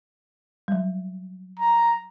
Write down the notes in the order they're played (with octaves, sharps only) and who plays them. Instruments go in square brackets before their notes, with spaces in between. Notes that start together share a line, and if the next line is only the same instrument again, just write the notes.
[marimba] F#3 G3
[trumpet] A#5